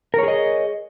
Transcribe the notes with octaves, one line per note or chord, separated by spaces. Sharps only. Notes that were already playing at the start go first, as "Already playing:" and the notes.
G#4 A#4 C#5 D#5